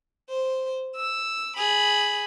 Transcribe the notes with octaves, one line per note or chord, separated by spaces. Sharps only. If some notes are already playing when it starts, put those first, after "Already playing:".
C5
E6
G#4 B5